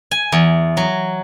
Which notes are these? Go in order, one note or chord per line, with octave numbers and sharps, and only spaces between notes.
G#5
E2
F#3